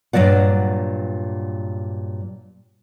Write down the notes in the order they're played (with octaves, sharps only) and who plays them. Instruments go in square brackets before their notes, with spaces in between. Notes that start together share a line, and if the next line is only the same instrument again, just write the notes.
[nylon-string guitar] G2 A#2 F#3 D5 F#5